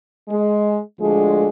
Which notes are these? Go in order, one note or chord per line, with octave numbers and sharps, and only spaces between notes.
G#3
D2 D3 F3 G#3